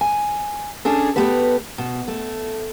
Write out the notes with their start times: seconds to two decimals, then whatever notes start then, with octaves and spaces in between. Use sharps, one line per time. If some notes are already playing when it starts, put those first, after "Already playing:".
0.01 G#5
0.85 C#4 D4 G#4 A4
1.16 A3 B3 G4 B4
1.78 B2
2.08 A3